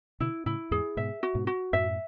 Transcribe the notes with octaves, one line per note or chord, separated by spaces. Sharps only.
B2 D3 E4
A2 C#3 E4
E2 G#2 G#4
G#2 B2 E5
F#4
G#2 B2
F#4
F#2 A2 E5